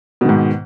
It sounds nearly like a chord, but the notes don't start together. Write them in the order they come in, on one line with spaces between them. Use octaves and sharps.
B2 D#3 G#2